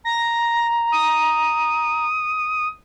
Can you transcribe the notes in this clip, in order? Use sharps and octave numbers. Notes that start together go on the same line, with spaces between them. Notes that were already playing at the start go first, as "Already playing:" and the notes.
A#5 A#6
D#6